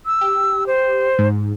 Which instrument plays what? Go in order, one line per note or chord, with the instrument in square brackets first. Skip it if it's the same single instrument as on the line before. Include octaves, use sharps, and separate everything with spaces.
[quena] E6
[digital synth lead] G4
[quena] C5
[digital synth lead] G#2